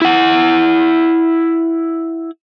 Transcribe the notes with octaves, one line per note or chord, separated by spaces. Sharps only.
E4 F#5